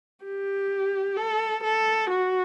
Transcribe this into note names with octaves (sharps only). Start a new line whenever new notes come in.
G4
A4
A4
F#4